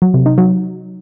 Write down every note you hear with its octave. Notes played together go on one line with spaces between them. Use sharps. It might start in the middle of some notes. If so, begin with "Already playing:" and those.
F#3
C3
D#4
F#3